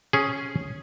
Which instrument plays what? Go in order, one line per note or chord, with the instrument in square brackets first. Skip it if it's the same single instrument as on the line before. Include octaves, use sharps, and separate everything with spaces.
[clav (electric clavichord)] C#4 G#4